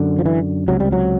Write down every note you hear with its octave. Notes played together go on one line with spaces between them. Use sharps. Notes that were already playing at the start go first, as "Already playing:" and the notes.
Already playing: F#2 D3
F3
E3
C#2 C3 F#3
G3
F#3